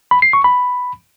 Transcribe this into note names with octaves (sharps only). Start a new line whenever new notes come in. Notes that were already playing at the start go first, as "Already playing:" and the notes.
B5
C7
C#6
B5